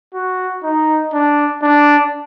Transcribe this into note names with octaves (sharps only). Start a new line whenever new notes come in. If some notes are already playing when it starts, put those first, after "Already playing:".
F#4
D#4
D4
D4